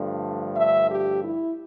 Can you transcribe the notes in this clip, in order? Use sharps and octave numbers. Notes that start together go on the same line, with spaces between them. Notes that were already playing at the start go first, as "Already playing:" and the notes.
Already playing: G2 D3 F3 A3
E5
G4
E4